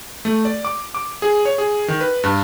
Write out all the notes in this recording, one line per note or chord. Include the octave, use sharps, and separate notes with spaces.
A3
D5
D6
D6
G#4
C#5
G#4
D#3
B4
G2